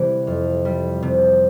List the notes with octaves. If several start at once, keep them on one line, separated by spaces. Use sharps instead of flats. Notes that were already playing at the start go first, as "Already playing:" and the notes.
Already playing: C3 E3 G3
F2
G3
C3